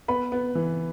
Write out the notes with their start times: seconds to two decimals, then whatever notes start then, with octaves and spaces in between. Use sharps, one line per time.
0.08 B3 B4 B5
0.32 B3
0.55 E3